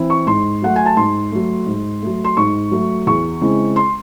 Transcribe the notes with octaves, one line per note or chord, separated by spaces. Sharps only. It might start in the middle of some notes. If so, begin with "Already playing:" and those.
Already playing: E3 C4 E4
C#6
G#2 C6
F#3 A3 F#5
G#5
A5
G#2 C6
F#3 A3
G#2
F#3 A3
C6
G#2 C#6
F#3 A3
E2 C#6
C#3 G#3 C4 E4
C6